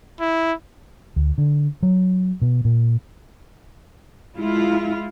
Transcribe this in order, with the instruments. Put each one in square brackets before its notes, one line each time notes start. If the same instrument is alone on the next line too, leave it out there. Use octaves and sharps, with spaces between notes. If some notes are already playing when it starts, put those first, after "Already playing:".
[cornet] E4
[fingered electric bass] D2
D3
F#3
B2
A#2
[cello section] G#3 E4 F4